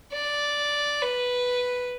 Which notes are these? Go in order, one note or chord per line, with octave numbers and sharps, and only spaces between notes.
D5
B4